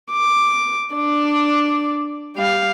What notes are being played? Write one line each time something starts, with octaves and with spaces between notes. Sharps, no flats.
D6
D4 D5
G3 F5